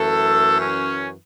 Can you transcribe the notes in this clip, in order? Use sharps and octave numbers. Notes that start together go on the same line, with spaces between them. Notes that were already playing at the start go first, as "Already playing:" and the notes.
Already playing: F#2 E3 A3 A4
C#4